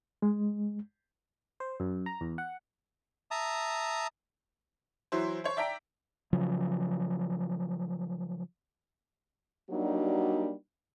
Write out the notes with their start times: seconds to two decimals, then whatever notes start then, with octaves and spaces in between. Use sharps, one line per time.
0.22 G#3
1.60 C5
1.80 F#2
2.06 A#5
2.21 E2
2.38 F#5
3.31 E5 A5 A#5 D#6
5.12 E3 F#3 E4 C5
5.44 C5 C#5
5.57 D5 E5 G5 A#5 B6 D7
6.33 C#3 F3 F#3
9.70 F#3 G3 A#3 D4 D#4 F#4